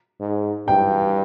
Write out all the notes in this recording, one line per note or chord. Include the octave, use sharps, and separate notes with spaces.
G#2
G2 G5